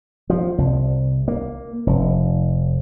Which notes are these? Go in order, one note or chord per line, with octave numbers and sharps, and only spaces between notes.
F3
C2
A#3
F1